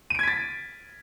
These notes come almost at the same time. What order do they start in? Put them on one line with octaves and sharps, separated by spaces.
D#7 D7 G#6 B6 A6